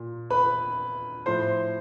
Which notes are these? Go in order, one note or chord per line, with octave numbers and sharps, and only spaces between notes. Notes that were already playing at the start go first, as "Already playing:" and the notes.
Already playing: A#2
B4 B5
A2 F3 C5 C6